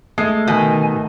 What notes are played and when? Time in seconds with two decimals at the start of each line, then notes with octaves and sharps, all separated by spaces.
0.18 G#3 A3 A4 C7
0.48 B2 D#3 G#5